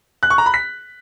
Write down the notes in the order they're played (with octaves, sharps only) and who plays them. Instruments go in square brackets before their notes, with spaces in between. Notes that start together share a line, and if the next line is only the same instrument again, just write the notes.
[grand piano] F#6
C#6
A#5
B5
B6